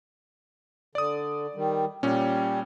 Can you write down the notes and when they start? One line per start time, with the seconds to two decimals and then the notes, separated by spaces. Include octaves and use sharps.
0.95 D3 D5 D#6
1.55 D#3 G3
2.03 A#2 G3 C#4